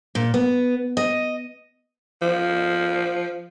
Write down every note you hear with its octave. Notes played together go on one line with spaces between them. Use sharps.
A#2
B3
D#5
F3